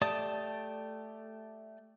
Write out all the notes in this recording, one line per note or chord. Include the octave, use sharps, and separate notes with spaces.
A3 G4 D5 A5 D#6